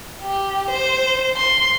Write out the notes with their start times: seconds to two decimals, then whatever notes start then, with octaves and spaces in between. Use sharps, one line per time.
0.22 G4
0.70 C5
1.37 C6